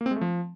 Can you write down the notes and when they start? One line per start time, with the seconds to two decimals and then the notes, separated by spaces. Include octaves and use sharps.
0.01 A#3
0.06 C4
0.11 G#3
0.16 A3
0.21 F3